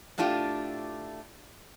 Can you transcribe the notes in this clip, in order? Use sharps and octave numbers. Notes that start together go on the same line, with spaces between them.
A2 A3 D4 F4 G4 G5